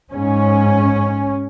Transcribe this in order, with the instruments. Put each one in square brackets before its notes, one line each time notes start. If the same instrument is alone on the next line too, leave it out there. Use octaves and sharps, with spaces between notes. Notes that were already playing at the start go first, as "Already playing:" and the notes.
[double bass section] G#2 C#4